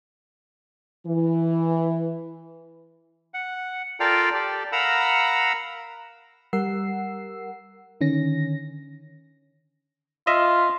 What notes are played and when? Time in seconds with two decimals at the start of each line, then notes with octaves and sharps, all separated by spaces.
1.06 E3
3.34 F#5
4.00 F4 A4 A#4 D5 F5 G5
4.34 G4 A4 D5
4.72 A#4 F5 F#5 A#5 B5 E6
6.53 G3 A#4 F#5 E6 C7
8.01 D3 D#3 C#4 A#6
10.27 F4 D#5 E5